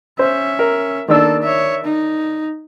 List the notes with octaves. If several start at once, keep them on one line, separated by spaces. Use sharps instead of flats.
C#4 C5 E5
A#4
D#3 A#3 D4 A4 E6
C#5 E5
D#4